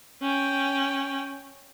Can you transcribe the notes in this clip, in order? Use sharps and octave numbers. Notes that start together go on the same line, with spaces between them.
C#4 G5